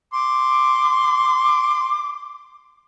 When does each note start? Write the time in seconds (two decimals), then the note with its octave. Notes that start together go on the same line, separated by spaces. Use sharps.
0.13 C6 D6